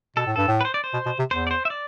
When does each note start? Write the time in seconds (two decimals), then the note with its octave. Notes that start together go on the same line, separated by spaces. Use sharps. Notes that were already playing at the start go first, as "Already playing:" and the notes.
0.16 B2 A4
0.27 A2
0.36 G2 A4
0.48 A2
0.61 B4
0.65 C5
0.74 D5
0.84 C5
0.93 B2
1.06 B2
1.19 C3
1.31 E2 C5
1.47 D5
1.51 C5
1.65 E5
1.70 D5